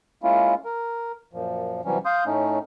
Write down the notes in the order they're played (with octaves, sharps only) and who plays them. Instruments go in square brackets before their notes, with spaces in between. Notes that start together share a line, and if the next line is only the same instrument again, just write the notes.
[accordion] G#3 A#3 C#4 E4 F4
A#4
F#2 A#2 F3
C3 E3 F#3 G3 C#4
F5 C6 D#6 G6
A2 A3 C#4 D#4